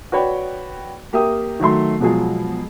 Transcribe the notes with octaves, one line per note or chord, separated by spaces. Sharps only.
F#4 B4 C#5 D5 G5
A#3 G4 A#4 E5 G5 D#6
D#3 F#3 A3 C6
B2 F3 F#3 G#3 F4 G#4